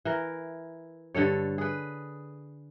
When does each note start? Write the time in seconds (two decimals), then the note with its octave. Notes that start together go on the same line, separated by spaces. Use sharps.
0.05 E3 A#4
1.15 G2 D3 A4 C#5
1.58 G#4 B4